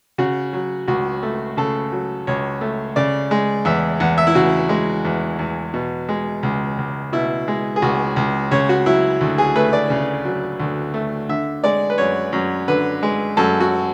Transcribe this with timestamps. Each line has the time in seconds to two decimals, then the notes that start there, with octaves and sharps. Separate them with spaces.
0.18 C#3 F#4
0.53 F#3
0.88 C#2 F#4
1.23 A3
1.57 C#3 A4
1.92 F#3
2.27 C#2 C#5
2.61 A3
2.96 C#3 D5
3.31 G#3
3.65 E2 E5
4.00 E2 F#5
4.18 E5
4.27 E4
4.35 C#3 F#4
4.69 G#3
5.05 E2
5.39 E2
5.74 B2
6.09 G#3
6.43 C#2
6.78 C#2
7.13 B2 E4
7.48 G#3
7.76 G#4
7.82 C#2 F#4
8.16 C#2
8.51 C#3 C#5
8.69 F#4
8.86 F#3 E4
9.21 D2
9.38 G#4
9.56 A3 B4
9.73 D5
9.90 C#3
10.25 F#3
10.60 D2
10.94 A3
11.29 D3 E5
11.64 G#3 D5
11.90 B4
11.98 F#2 C#5
12.33 F#2
12.68 D3 B4
13.03 G#3
13.37 F#2 A4
13.60 F#4